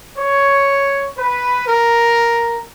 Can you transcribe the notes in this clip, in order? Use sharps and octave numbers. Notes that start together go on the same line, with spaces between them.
C#5
B4
A#4